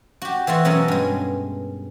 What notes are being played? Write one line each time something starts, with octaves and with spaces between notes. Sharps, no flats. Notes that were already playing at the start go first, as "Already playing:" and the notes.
F#4 G4
E3 A3 F4 F#4
B2 F#3 C#4 A4 A#4
G2 G#3